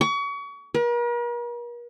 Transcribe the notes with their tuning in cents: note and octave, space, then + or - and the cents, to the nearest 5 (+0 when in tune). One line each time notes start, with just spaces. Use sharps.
C#6 +35
A#4 +45